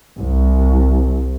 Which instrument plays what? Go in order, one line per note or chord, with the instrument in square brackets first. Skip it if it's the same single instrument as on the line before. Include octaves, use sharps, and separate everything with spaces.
[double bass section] C2